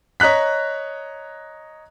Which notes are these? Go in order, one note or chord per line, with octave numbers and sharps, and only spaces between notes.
C#5 D#5 A#5 F#6 B6